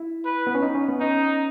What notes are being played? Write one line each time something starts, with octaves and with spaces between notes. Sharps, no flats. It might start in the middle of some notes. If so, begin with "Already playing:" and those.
Already playing: E4
B4
B3
C#4
D#4
C#4
B3
C#4 D#4